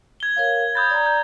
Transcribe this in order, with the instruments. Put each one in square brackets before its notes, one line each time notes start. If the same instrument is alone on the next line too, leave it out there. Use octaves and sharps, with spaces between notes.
[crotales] G#6 G7
[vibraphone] A#4 C#5 F5
[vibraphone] B5 [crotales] D#6 G6 A6
[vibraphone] D5 A#5
[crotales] G6